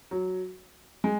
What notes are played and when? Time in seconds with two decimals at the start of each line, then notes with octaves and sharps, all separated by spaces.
0.11 F#3
1.04 G#3